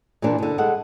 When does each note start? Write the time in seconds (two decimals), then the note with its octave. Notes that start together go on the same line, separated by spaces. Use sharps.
0.22 A#2 E3 F3 A#3 D4
0.38 B2 D3
0.58 G3 G#3 A4 F#5